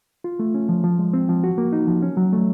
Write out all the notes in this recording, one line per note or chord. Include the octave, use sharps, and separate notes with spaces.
F4
A3
C#4
F3
F3
G#3
C4
F3
F#4
A#3
D#4
F3
C#4
F#3
A3